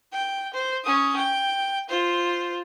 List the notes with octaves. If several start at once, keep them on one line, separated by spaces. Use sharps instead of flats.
G5
C5
C#4 D#6
G5
F4 C5